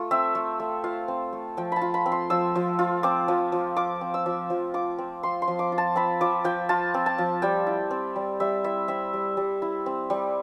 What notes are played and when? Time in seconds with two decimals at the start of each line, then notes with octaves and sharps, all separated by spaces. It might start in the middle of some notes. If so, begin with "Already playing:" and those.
Already playing: A3 F4
0.11 C4 E5
0.35 A3
0.60 A3
0.84 F4 F5
1.08 C4
1.33 A3
1.57 F3 G5
1.72 A5 B5
1.82 F4
1.94 B5
2.06 C4
2.12 C6
2.30 F3 E6
2.55 F3
2.79 F4
3.03 C4 D6
3.28 F3
3.52 F3
3.77 F4 D6
4.01 C4
4.14 E6
4.26 F3
4.50 F3
4.74 F4 D6
4.98 C4
5.23 F3 C6
5.42 C6
5.48 F3
5.59 D6
5.72 F4
5.78 A5
5.96 C4 B5
6.21 F3 D6
6.44 F3 G5
6.69 F4 A5
6.94 C4
7.06 A5
7.18 F3
7.42 G3 G5
7.67 E4
7.91 C4
8.16 G3
8.40 G3 E5
8.64 E4 E5
8.88 C4 E5
9.13 G3
9.37 G3
9.62 E4
9.86 C4
10.10 G3